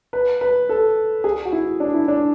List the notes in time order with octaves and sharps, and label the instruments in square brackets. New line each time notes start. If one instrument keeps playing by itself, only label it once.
[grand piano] B4
B4
A4
G#4
F#4
E4
D4
E4
D4